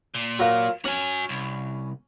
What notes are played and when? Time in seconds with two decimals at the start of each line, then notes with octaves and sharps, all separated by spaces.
0.14 A#2
0.39 F#3 F4 A#4
0.85 C#4 F#4 G#5
1.29 C2